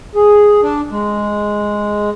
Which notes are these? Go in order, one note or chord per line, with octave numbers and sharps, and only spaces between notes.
G#4
D4
G#3